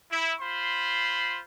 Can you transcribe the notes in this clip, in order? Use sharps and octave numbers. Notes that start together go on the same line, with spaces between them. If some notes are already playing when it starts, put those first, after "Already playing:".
E4
F4 C5 B5 C6